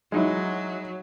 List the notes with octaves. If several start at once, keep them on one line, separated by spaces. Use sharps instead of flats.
F#3 G#3 D#4 E4